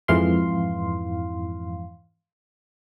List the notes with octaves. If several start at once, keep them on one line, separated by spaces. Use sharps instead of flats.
F2 G#2 E3 F5 C6